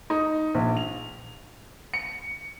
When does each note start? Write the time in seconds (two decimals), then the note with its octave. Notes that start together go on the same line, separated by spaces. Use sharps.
0.10 D#4
0.54 A#1
0.77 F7
1.94 C#7